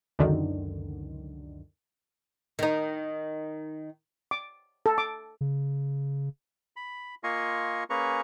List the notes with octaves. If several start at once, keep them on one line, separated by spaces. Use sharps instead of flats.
C#2 F#2 D3 D#3
D#3 D#4
D6
A4
D6
C#3
B5
A#3 F4 D#5 G#5 C6 C#6
A#3 C#4 G#4 B4 A#5 C#6